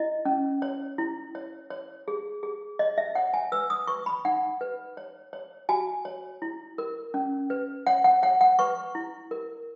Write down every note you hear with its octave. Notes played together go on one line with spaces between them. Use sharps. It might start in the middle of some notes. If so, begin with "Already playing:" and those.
Already playing: E4 D#5
C#4
C#5
E4
C#5
C#5
G#4
G#4
C#5 D#5
E5
C#5 F#5
G#5
B4 E6
D#6
B4 C#6
B5
D#4 F#5
B4
C#5
C#5
F#4 G#5
C#5
E4
A#4
C#4
B4
C#5 F#5
F#5
C#5 F#5
F#5
B4 C#6
E4
A#4